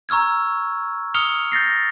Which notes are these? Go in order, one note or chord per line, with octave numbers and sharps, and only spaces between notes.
A#5 C#6 E6 F6 G#6
D#6 F6 C#7 F7 G7
G6 A6 A#6 C7